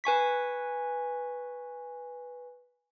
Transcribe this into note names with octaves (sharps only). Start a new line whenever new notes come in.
B4 G#5 C#6 B6